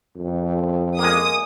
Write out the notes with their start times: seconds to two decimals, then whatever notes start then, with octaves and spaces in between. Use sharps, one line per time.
0.16 F2
0.99 G#3 A#3 D#6